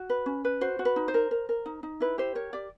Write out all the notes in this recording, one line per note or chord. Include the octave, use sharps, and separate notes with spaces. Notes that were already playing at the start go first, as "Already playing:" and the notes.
Already playing: F#4
B4
C#4
B4
F#4 C5
F#4
B4
D#4
C5
A#4
A#4
A#4
D#4
D#4
E4 B4
G4 C5
A#4 C#5
G4 D5